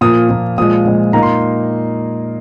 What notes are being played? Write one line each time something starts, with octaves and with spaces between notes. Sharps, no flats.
A#2 F3 A#3 D#6
A#2 F3 A#3
A#2 F3 G#3 D#6
A#2 F3 G#3
A#2 A#3 D#4 A#5
C6